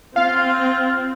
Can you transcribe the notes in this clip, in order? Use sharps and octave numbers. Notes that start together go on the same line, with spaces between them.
C4 F4 F5